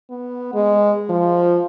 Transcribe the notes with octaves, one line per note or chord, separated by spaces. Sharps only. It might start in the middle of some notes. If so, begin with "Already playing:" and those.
B3
G#3
F3